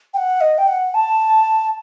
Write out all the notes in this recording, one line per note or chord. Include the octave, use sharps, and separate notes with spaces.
G5
F#5
D#5
G5
F#5
A5